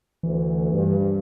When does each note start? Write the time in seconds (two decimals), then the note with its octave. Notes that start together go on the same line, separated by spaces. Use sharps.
0.23 D2 E3
0.72 G2